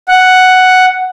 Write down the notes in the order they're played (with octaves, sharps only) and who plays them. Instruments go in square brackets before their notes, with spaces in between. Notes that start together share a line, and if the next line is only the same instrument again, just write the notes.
[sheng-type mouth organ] F#5